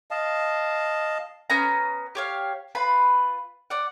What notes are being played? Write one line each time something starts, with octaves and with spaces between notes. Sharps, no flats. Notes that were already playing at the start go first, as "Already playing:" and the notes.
D#5 F5 A5
B3 C#4 A#5
G4 C#5 F5
F4 B4 B5
D5 F#5